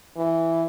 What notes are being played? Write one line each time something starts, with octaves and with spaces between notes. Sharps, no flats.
E3